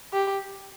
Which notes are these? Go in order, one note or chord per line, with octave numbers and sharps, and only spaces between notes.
G4